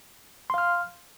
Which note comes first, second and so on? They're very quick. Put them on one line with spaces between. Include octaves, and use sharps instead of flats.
C6 F5 F6